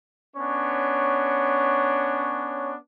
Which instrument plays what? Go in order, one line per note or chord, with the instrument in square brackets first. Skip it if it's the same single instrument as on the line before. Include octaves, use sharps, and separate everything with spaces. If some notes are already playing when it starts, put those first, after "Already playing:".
[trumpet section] B3 C#4 D4 C#5